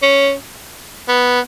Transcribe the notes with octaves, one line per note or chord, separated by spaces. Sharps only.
C#4
B3